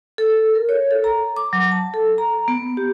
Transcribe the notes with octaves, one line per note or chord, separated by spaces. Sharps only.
A4
A#4
C#5
A4
A#5
D6
F#3
A5
A4
A#5
B3
G4